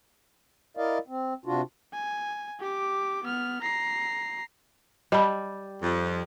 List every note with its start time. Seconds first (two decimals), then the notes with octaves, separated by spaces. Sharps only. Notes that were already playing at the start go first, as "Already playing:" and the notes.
0.77 E4 A#4 D5 D#5 F5
1.08 C4
1.45 C3 D4 F4 F#4
1.93 G#5
2.60 G4 D6
3.24 B3 F6
3.62 A#5 C7
5.12 G3 D#5 A5 B5
5.83 F2